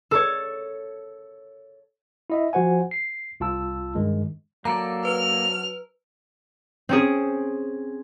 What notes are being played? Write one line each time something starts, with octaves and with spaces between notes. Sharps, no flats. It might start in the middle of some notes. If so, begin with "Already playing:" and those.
A4 C#5
E4 D#5 E5
F3 F#4 C5 F#5 G#5
C7
C2 F4 A5 E6
G2 D#3 G#3
F#3 A#3 A4 D5 A5 A#5
B4 F6
C4 C#4 G#4